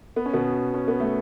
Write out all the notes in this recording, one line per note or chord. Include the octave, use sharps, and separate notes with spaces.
B3
C#4
B2 B3
C#4
B3
A3